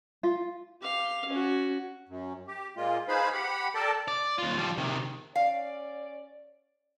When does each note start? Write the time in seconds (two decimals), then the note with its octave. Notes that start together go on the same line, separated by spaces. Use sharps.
0.23 F4
0.81 G4 F5
1.28 C#4 F#4
2.09 F#2
2.48 G4
2.77 A#2 G#3 A#3 F4
3.08 D#4 G#4 B4 C5 F5 B5
3.33 G4 F#5 B5
3.75 A4 A#4 D5 G5 A5
4.08 D5
4.38 D#2 F4
4.57 F3 G3
4.78 C3 D#3
5.36 C#4 C#5 D5 F5